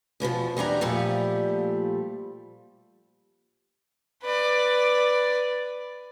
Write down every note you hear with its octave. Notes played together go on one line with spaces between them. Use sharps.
E2 B2 E3 F3
E2 G3 D4 A#5
A#2 F3 G3 A3
B4 D5